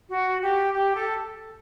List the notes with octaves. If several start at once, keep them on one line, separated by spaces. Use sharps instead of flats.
F#4
G4
G4
A4